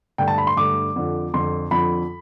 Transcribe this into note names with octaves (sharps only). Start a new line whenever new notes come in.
G2 D3 A3 G5
A5
B5
C6
G2 D3 A3 D6
F2 D3 F3
F2 D3 F3 C6
F2 D3 F3 B5